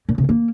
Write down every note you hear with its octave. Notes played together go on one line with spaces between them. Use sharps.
A#2
C3
A#3